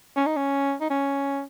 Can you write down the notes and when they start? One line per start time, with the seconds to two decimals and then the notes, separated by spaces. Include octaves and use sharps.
0.16 C#4
0.26 D#4
0.36 C#4
0.81 D#4
0.90 C#4